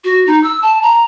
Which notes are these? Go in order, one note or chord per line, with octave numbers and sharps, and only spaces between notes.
F#4
D#4
E6
A5
A#5